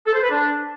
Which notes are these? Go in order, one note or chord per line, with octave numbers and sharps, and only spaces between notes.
A4
C5
B4
D4